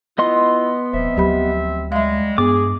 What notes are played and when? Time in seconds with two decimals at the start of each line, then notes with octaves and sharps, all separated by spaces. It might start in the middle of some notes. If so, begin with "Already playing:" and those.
0.18 B3 E4 F4 D#5 C6
0.93 D#1 F3 C4 C5 E5
1.17 D2 F#3 G4 B5
1.92 G3 G#3 E5 F5
2.38 G2 B3 G#4 D6